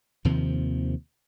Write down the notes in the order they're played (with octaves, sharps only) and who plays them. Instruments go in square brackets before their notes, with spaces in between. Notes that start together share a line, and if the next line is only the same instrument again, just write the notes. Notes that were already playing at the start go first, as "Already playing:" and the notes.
[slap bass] D#2 C3 D#3 F3